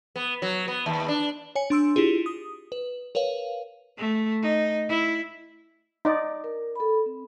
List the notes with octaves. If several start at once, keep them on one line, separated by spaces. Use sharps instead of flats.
B3
F#3
B3
D#2
D4
C#5 G#5 C#7
D4 C6 E6 D7
E4 F4 G4 G#4
D#6
B4
A#4 B4 C#5 F5
A3
D#4
E4
D#4 D5
A#4
A4 B5
C4